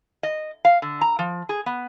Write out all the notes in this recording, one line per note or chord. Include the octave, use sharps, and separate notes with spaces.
D#5
F5
D3
A#5
F3
G#4
B3